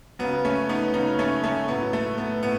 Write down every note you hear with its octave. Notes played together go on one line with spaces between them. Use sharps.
C#3 F#3 B3
A3 C#4
B3 D#4
C#3 F#3 B3 D#4
A3 C#4
A3 C#4
A2 F#3 B3
A3
B3
A2 B3